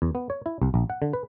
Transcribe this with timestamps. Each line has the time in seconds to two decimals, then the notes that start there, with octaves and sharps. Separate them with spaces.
0.02 E2
0.15 B3
0.30 C#5
0.46 E4
0.62 C2
0.74 A#1
0.90 F#5
1.02 D3
1.13 B4